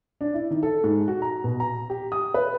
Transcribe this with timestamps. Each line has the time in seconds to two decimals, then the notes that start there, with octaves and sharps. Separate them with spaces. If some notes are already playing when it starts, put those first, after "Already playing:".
0.21 D4
0.34 E4
0.51 D#3
0.63 A4
0.84 G#2
1.08 F#4
1.22 A#5
1.44 B2
1.60 A#5
1.90 G4
2.12 D#6
2.34 B4